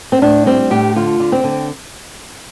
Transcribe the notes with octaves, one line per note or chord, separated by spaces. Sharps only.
C4
A2 D4
G3 C4
A2 G4
D3 F4
D3
C4
D3